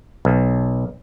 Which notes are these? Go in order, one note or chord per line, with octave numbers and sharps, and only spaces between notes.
B1